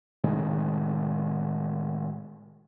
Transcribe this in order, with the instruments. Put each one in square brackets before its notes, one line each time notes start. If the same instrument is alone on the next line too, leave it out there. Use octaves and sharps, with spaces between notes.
[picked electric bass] A2 C3 D#3 G#3